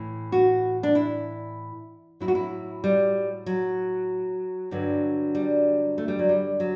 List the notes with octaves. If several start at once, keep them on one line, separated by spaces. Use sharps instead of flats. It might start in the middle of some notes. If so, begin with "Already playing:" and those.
Already playing: A2 E3
F#4
D4
E4
A2 F#3 E4
F#4
E4
G3
F#3
G2 D3 F#3
G3
A3
G3
F#3
G3
F#3